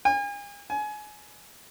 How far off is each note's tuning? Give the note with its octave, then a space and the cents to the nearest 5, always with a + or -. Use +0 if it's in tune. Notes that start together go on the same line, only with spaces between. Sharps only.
G#5 -40
G#5 +25